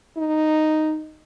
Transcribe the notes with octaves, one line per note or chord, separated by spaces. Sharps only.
D#4